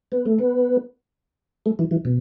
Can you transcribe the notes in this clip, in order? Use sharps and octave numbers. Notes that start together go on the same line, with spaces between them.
B3
A3
B3
A3
E3
E3
B2